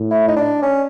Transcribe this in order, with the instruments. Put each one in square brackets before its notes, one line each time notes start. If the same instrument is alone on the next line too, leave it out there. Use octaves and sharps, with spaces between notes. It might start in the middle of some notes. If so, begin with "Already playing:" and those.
Already playing: [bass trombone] A2
[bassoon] E4
D#4
D4
C#4